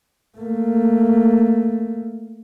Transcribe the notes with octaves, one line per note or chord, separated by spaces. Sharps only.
A3 A#3